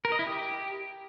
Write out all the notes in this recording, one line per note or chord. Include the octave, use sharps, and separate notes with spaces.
A#4
D#5
E4
G4